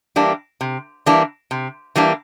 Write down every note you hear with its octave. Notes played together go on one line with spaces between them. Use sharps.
E3 G3 A#3 D4
C3
E3 G3 A#3 D4
C3
E3 G3 A#3 D4